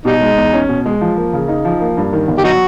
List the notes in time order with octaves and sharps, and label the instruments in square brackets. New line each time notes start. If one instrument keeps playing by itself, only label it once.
[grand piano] B2 [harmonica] G3 D#4
[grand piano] G#3
E2
C#4
B2
G#3
F3
A#3
C#3
D#4
F3
A#3
G2
D#3
G1
[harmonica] G4
[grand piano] F#3 [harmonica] D#4 F#4